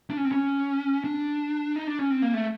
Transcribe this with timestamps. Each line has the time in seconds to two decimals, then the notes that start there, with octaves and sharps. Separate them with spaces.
0.10 D4
0.17 C#4
0.25 C4
0.32 C#4
1.04 D4
1.76 D#4
1.87 D4
1.99 C#4
2.10 C4
2.22 A#3
2.34 A3